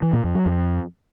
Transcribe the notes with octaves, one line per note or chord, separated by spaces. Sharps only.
E3
A#2
F2
F#3
F2